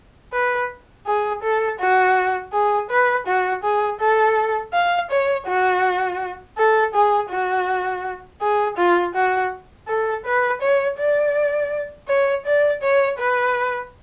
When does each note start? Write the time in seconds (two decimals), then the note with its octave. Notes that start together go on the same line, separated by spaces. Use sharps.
0.32 B4
1.06 G#4
1.43 A4
1.80 F#4
2.53 G#4
2.90 B4
3.27 F#4
3.64 G#4
4.00 A4
4.73 F5
5.10 C#5
5.47 F#4
6.57 A4
6.94 G#4
7.30 F#4
8.41 G#4
8.77 F4
9.14 F#4
9.88 A4
10.25 B4
10.61 C#5
10.99 D5
12.08 C#5
12.45 D5
12.82 C#5
13.19 B4